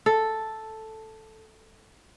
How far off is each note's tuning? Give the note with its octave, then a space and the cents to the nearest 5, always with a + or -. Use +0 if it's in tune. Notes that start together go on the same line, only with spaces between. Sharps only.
A4 +0